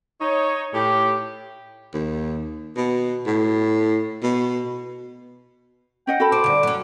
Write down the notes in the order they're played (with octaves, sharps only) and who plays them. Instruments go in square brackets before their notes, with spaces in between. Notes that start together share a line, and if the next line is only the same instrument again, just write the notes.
[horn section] D#4 C#5
A2 G4
[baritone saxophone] D#2
B2
A2
B2
[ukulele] C#4 D#5 F#5 [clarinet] G5
[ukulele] F#4 A4 B5
[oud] C5 [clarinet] D6
[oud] G2 D3
F#3 C#4